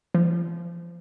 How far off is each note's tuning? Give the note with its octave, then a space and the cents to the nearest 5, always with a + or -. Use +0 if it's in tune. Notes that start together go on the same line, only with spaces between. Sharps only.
F3 -25